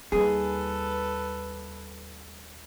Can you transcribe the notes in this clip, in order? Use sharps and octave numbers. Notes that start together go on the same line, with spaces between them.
D#2 G3 G#4 A4 B4